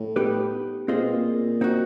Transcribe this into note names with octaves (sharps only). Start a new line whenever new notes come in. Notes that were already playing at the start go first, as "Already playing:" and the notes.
Already playing: A2
B3 D#4 G4 B4
A#2 C4 F4 G#4 C5 D#5
B2
A#2
C4 D#4 F#4